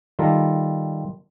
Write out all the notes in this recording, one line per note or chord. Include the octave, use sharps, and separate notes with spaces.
D#3 G3 F4 A4 A#5